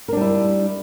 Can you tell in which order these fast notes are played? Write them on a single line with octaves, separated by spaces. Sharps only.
A#4 D4 G3 E4